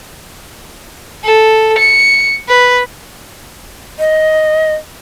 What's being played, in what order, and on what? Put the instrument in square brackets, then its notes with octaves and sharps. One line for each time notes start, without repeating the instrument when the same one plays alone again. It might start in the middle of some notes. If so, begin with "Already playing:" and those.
[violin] A4
C#7
B4
[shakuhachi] D#5